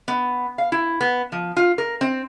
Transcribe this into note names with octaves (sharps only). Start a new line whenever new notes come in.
B3
F5
E4
B3
F3
F4
A#4
C4